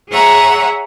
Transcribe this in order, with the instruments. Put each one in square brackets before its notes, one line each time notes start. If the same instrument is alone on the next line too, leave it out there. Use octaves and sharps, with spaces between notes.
[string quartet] G#4 C#5 E5 F#5 A#5